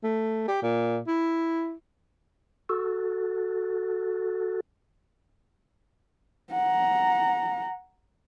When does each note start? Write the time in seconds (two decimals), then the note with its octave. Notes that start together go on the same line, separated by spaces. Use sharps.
0.03 A3
0.48 G4
0.62 A#2
1.07 E4
2.69 F#4 A4
6.51 F#5 A#5